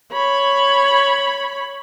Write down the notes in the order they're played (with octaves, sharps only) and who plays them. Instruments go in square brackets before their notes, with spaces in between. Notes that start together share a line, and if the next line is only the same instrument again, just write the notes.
[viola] C#5 B5